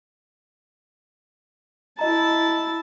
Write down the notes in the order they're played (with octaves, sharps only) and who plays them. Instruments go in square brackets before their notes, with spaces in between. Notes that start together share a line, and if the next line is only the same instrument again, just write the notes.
[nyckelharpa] E4 A5 [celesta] D#5 A#5